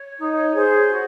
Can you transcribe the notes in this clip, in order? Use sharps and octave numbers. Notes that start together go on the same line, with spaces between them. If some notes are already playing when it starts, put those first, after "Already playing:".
Already playing: C#5
D#4
G#4 C5
F#4